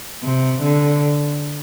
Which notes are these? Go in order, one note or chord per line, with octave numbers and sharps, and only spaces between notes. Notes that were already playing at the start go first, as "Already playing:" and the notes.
C3
D3